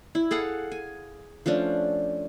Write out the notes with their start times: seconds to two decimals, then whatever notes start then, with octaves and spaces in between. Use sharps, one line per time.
0.15 E4
0.31 G#4 A4 F5 F#5
0.72 G#5
1.46 F3 A3 C#4 D4